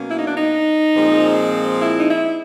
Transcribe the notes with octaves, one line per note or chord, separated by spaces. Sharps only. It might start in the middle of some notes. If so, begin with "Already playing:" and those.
Already playing: B2 F#3 A#3 C#4
E4
D#4
D4
D#4
A#2 F3 G#3 C4
E4
D#4
E4